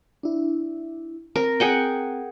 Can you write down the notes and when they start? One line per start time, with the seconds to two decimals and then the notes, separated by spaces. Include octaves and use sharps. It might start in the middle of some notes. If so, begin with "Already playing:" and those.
0.23 D4 E4
1.36 C4 A#4
1.60 G#4 F#5 G5